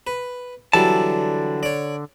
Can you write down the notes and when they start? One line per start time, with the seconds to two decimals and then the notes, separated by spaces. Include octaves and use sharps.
0.07 B4
0.73 D3 E3 F#3 G3 A4 A5
1.63 C#5 D5